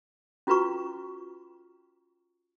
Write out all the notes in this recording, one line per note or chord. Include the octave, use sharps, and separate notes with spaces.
C#4 F4 F#4 B4 A#5 C#6